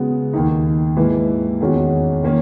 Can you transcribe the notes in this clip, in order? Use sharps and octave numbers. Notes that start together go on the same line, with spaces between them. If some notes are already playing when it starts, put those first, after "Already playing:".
Already playing: C#3 G#3 B3 F#4
D#2 D#3 A#3 D#4
G#2 E3 A#3 E4 B4
E2 D#3 G#3 C#4 F#4
D#3 A#3 C#4